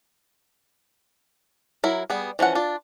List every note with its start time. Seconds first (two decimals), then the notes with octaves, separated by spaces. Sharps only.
1.84 F#3 E4 A#4
2.10 G3 B3 G#4
2.39 E3 F3 C#4 F#5
2.55 D4 F4